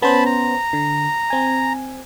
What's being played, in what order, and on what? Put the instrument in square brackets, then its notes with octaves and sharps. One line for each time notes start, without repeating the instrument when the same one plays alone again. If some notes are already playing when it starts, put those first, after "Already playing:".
[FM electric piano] B3 C#4 C5 [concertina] A5 B5
[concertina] A#5
[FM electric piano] D3
C4 G#5